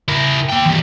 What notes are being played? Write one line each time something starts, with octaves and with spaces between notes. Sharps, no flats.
E4 A#4
A#3 G5
E3 G3